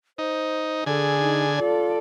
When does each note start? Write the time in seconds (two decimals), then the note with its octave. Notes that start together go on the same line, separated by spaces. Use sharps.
0.18 D#4 C5
0.86 D3 G#4 A4 G#5
1.20 D#4
1.59 F4 A4 D5